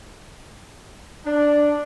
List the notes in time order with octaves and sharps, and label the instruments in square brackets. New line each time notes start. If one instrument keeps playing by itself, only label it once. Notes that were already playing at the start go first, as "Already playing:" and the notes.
[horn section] D4